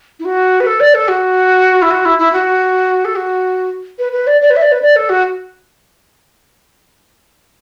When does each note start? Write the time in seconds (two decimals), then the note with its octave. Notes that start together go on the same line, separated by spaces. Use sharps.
0.19 E4
0.25 F#4
0.60 B4
0.66 A4
0.80 D5
0.94 A4
1.08 F#4
1.82 E4
1.90 F#4
2.05 E4
2.18 E4
2.32 F#4
3.04 A4
3.16 F#4
3.98 B4
4.12 B4
4.27 D5
4.41 D5
4.50 B4
4.56 E5
4.61 D5
4.71 B4
4.82 D5
4.96 A4
5.09 F#4